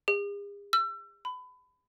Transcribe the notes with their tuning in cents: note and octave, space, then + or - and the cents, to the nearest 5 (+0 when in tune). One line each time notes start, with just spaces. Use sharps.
G#4 -45
E6 +35
B5 +25